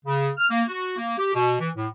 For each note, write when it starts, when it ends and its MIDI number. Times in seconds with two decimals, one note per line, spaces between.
0.05 0.30 49
0.38 0.46 89
0.51 0.63 58
0.68 0.97 66
0.98 1.15 58
1.18 1.31 67
1.35 1.55 47
1.60 1.70 52
1.76 1.88 45